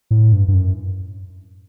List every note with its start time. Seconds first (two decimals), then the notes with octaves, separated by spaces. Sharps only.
0.11 A2
0.33 G2
0.48 G2
0.54 F#2